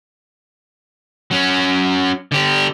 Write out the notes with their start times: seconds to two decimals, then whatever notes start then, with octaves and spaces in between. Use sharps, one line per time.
1.31 F#3 C#4
2.32 D3 G4